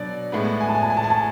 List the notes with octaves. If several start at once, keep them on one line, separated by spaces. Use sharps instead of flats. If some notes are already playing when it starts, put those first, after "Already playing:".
Already playing: B2 F#3 D4 D5
A2 G#3 B3
G#5
A5
G#5
A5
G#5
A5
G#5
A5